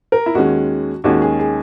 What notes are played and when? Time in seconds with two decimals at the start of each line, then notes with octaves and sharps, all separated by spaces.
0.12 A#4
0.26 E4
0.35 D#2 D#3 G#3 C#4 F#4
1.04 D#2 D#3 G#3 C#4 F#4
1.22 G#4
1.39 G#4